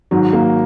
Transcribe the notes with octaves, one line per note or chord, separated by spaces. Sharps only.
G#2 D#3 F#3
A#3